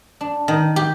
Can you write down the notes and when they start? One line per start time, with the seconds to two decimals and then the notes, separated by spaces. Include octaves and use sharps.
0.21 D4
0.48 D#3
0.76 G4